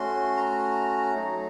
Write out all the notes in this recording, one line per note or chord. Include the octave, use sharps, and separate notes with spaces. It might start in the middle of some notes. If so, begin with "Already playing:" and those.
Already playing: A3 C#4 F#4 C6
A#5
F#3 A3 D#4